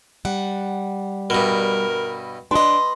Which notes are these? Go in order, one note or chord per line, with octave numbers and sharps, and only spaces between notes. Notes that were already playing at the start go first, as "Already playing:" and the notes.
G3 F#5
G2 B2 A#4
D4 B4 D#5 C6